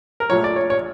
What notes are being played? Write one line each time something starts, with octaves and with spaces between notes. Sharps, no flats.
A#4
A#1 A#2 F3 A3 C#5
D5
C#5
C#5